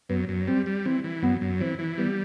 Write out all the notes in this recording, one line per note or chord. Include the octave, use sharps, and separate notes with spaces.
F#2 B3
F#2
G3 C4
G3
E3 C4
E3
F#2 B3
F#2
E3 C4
E3
G3 B3